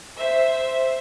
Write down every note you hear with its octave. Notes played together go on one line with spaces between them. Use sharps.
C5 E5